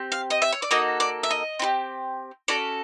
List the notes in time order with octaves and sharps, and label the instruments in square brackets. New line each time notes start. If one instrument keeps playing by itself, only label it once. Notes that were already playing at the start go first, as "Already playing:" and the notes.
Already playing: [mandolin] C4 G4
F5
D#5
E5
C#5
D5
A#3 D#4 F#4 A4 D#5
D5
E5
D#5
C4 E4 G4
C#4 F#4 A4 D5